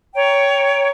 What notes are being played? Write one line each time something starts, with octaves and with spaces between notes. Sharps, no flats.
C#5 G5 A#5